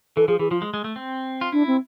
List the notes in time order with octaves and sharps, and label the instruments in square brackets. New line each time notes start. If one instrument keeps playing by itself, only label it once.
[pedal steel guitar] E3 [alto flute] A4
[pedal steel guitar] F3 [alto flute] G#4
[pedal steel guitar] E3 [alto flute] G#4
[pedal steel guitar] F3 [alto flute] F4
[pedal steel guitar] G#3
G#3
A3
C4
F4
[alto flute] D4 [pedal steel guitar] E4
[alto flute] C4